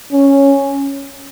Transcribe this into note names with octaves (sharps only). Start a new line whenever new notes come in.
C#4